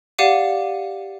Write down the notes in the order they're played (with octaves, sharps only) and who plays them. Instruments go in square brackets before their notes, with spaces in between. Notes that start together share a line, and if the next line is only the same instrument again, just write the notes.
[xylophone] G4 D5 F5 F#5 D6 D#7